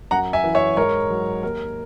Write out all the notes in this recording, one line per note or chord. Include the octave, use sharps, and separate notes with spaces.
F#2 F#5 A#5
E5 G#5
E3
C#5 E5
G#2 A#4 C#5
F#3
D#2 A#4